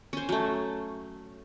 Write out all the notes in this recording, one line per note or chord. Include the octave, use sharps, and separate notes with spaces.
C#4 C5
F#3 A3